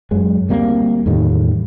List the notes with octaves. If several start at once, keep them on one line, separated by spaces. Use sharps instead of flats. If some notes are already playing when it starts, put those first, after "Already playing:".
F#2 F#3 G#3
D2 G3 A#3 C4
E2 A2 D#3 G3